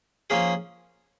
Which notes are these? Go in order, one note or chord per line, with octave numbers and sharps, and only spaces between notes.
F3 A#3 C#4 G#4